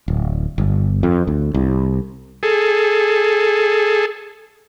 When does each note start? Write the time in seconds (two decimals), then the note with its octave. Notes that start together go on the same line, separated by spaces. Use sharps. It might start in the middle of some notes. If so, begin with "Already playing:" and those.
0.08 D1
0.58 G1
1.03 F2
1.27 D2
1.54 C2
2.43 G#4 A4